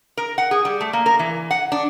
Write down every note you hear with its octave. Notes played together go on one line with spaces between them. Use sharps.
A#4
F#5
G#4
G3
A3
A#3
A#4
E3
F#5
D4